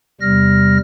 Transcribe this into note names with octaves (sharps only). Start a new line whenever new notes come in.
E2 C3 G3 F6 A#6